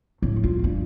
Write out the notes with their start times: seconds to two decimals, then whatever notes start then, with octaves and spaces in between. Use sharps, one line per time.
0.22 A2
0.44 F4
0.64 G2